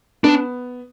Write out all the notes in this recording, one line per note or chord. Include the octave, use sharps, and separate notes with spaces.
B3 D4